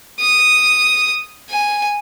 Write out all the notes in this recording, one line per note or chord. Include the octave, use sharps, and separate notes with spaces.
D#6
G#5